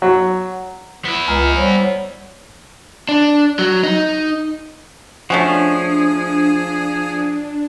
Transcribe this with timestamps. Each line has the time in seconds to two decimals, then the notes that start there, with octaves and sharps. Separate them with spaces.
0.02 F#3
1.05 B3 E4
1.28 C#2 G#5 A#5 F6
1.57 G3 C5 C#5 F#5
3.09 D4
3.59 F#3
3.84 D#4
5.30 F3 A3 C#4 D4 F#4 G#4